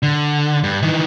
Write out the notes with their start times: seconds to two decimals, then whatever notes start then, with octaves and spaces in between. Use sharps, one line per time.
0.03 D3
0.63 G2
0.83 D#3 E3